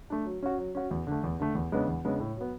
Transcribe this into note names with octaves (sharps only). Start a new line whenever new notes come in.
A3 D4
F#3
C#4 F#4
F#3
C#4 F#4
E2
D3 A3
E2
D3 A3
E2
C#3 G#3 B3 D4
E2
C#3 G#3 B3 D4
A2
F#3 B3